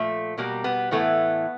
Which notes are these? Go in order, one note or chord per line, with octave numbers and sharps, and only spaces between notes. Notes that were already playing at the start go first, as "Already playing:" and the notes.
Already playing: A#2 F3 A3
B2 G3 A#3
B3
A2 E3 A3 B3